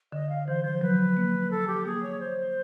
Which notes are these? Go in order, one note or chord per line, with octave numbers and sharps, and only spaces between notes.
D3 D#5
F5
E3 C5
F3 C5
F#3 B4
A#3
A4
G4
A#3 G#4
C#5
C5